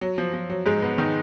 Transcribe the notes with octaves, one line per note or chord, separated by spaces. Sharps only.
F#3
F3
F3
F#3
G#2 G#3
B2 B3
D#3 D#4